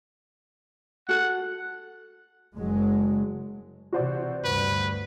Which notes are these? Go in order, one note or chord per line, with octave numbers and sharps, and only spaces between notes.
F#4 A4 F#5
F#1 F#3 G#3
C3 E3 F#4 C5 D5
D2 G2 B4